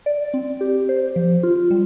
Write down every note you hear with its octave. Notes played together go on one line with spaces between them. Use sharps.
D5
C4
G4
C5
F3
F4
G3